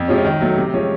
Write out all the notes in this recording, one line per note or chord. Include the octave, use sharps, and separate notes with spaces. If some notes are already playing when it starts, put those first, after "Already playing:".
Already playing: F2
C3 F3 G#3 C#4
D#3
F#3 A3
C3
F3 G#3 C#4